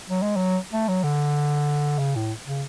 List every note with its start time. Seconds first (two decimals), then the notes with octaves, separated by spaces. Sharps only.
0.10 F#3
0.23 G#3
0.36 F#3
0.73 A3
0.88 F#3
1.04 D3
1.99 C#3
2.16 A2
2.46 C#3